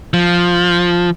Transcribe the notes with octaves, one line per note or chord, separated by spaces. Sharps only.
F3